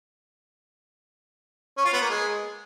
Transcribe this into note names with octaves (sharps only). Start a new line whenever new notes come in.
C#4
F4
B3
A#3
G#3